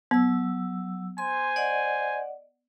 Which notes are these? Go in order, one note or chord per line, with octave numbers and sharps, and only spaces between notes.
F#3 B3 E6
C5 G#5 C6
D5 D#5 F#5